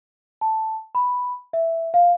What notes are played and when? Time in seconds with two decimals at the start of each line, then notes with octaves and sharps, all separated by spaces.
0.41 A5
0.95 B5
1.53 E5
1.94 F5